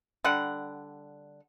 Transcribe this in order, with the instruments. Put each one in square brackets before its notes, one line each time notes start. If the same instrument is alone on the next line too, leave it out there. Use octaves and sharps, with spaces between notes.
[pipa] D3 G3 F#5